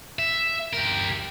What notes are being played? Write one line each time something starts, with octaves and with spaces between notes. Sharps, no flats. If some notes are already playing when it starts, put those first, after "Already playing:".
E5
G4 A#4